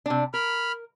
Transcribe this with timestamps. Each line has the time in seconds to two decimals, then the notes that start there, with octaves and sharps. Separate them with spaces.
0.06 C3 D4
0.34 A#4 B5 F6